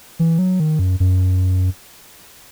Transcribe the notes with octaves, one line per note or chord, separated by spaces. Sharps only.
E3
F#3
D#3
F#2
F#2